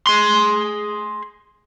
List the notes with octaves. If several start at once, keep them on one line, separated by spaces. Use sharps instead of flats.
G#4 C6